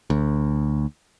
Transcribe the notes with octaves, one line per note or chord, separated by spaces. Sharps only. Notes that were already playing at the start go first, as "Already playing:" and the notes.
D2